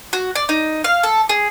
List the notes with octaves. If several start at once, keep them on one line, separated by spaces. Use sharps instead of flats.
F#4
D5
D#4
F5
A4
G#4